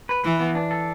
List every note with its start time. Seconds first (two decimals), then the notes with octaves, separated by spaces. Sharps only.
0.09 B4
0.24 E3 B4
0.40 B3
0.55 D4
0.71 A4